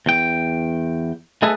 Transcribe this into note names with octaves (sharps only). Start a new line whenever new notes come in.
E2 G5
A3 D#4 G#4 A4 B4